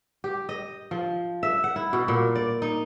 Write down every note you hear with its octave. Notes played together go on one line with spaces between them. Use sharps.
G4
D#5
F3
E5
F#5
E4
B2
A#2
D5
D#4